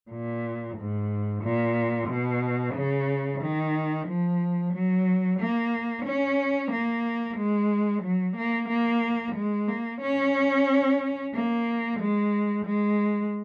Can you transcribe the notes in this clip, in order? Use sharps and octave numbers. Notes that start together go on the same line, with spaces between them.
A#2
G#2
A#2
B2
C#3
D#3
F3
F#3
A#3
C#4
A#3
G#3
F#3
A#3
A#3
G#3
A#3
C#4
A#3
G#3
G#3